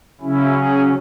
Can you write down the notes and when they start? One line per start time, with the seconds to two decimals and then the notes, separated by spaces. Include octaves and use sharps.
0.21 C#3 F#3 C#4 E4
0.50 G#4